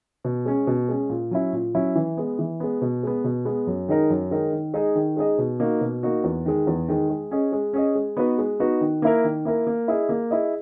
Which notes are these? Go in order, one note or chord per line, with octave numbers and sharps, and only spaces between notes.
B2
G#3 C#4
B2
G#3 C#4
A#2
F#3 C#4 E4
A#2
F#3 C#4 E4
E3
G#3 B3
E3
G#3 B3
B2
G#3 B3
B2
G#3 B3
F#2
D#3 G#3 D#4 A#4
F#2
D#3 G#3 D#4 A#4
D#3
G#3 D#4 G#4 D#5
D#3
G#3 D#4 G#4 D#5
B2
A#3 D#4 F#4
B2
A#3 D#4 F#4
E2
D#3 G#3
E2
D#3 G#3
G#3
C#4 G#4 D#5
G#3
C#4 G#4 D#5
G#3
B3 D#4 F#4 B4
G#3
B3 D#4 F#4 B4
D#3
A#3 E4 A#4
D#3
A#3 E4 A#4
A#3
E4 G#4 D#5
A#3
E4 G#4 D#5